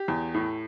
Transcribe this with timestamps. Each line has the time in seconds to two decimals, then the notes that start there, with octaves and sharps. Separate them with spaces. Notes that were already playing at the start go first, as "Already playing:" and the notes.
Already playing: G4
0.08 E2
0.34 A2